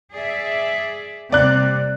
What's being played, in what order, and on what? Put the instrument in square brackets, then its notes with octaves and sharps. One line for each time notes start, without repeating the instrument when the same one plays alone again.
[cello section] G#4 D5 E5
[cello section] C3 G3 A#3 [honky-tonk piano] D5 F#6